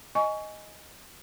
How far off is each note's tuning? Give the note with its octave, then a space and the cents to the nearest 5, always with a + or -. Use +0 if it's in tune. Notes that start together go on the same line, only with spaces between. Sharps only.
D#5 +0 G#5 +0 C#6 +25